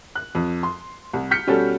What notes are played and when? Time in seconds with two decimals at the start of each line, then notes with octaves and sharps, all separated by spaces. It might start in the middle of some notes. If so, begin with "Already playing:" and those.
0.15 F#6
0.35 F2
0.63 C6
1.13 C2
1.31 F6 G6 B6 C#7
1.47 B2 G3 C#4 F#4 A4